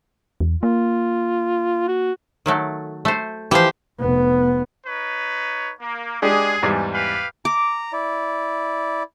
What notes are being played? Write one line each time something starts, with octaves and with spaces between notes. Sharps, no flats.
E2
A#3 F4
F#4
D#3 F#3 A3
A3 C5
E3 F3 G4 C5
F1 B3
D#4 B4 C#5
A#3
G#3 D4 G4 G#4
E2 G#2 G3
G4 B4 F5
A#5 D6
E4 D5